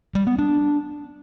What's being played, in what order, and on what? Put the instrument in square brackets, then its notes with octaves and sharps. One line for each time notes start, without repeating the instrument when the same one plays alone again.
[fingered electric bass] G3
B3
D4